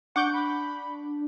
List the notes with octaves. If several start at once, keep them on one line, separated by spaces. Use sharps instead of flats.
D4 F#5 C#6 D6 G6
B5